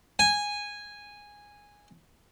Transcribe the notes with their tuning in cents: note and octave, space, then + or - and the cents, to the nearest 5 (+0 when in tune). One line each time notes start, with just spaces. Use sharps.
G#5 -10